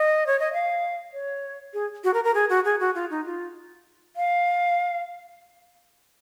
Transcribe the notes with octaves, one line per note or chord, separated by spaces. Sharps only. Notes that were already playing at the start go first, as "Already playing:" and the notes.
Already playing: D#5
C#5
D#5
F5
C#5
G#4
F#4
A#4
A#4
G#4
F#4
G#4
F#4
F4
D#4
F4
F5